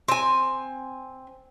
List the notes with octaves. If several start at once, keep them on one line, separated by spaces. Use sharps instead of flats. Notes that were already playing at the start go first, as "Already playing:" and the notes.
C4 G#5